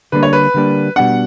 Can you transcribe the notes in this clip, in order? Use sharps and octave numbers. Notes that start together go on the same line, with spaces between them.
D3 G3 A#3 D4 B4
C#5
B4
D3 G3 A#3 D4
B2 G3 B3 D4 F#5